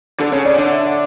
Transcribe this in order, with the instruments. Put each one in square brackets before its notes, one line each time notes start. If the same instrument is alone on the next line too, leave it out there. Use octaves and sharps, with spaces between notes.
[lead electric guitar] D3 [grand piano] A4
[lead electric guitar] C#3 [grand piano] C#5
[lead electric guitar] C#3 [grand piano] D5
[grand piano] C#5
[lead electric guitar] D3 [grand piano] D5
[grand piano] E5
E5